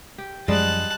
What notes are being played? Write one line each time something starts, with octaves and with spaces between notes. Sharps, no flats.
G4
F#2 F3 G3 G#3 D#5 A5 F#6